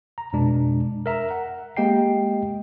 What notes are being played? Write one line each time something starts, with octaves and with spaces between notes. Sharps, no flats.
A#5
F2 B2 G#3 D4
A#4 E5 A#5
F#5
G#3 A#3 G4 D#5 G5 C7